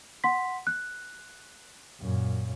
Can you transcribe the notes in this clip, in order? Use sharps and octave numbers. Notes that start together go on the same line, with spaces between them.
F#5 C6 B6
F#6
F#2 A#2